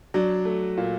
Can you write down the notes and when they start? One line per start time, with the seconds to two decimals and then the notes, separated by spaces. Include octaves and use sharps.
0.14 F#3 D4
0.45 A3
0.77 A#2